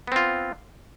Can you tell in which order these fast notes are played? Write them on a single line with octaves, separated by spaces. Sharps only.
B3 C4 F4